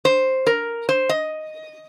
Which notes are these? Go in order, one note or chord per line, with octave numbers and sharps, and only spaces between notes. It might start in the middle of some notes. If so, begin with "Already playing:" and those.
C5
A#4
C5
D#5